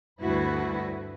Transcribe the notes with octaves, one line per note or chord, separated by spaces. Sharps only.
D2 G2 E4 F#4 B4